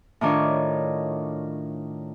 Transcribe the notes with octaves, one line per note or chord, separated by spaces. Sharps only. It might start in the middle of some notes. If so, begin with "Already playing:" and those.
A2 D#3 D4 F4 C#5